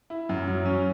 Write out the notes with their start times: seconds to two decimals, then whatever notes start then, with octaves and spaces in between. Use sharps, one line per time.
0.10 E4
0.29 F#2
0.48 F#3
0.65 C#4